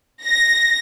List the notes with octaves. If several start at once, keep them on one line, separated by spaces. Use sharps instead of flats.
A#6